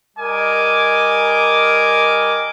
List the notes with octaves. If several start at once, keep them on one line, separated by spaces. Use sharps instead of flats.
G3 A#4 D#5 G#5 D6